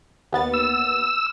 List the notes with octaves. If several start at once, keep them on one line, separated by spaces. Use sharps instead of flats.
D#2 B3 A6
E6